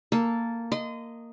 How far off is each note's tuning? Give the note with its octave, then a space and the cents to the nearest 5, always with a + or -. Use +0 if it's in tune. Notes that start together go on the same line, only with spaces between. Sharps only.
A#3 -10 A4 +0
D#5 +0 C6 -35